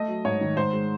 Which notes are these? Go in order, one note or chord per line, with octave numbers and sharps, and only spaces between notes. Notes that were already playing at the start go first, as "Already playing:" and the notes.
Already playing: A3 D#5
F#3
G#2 C#5
D#3
G#2 C5
G#3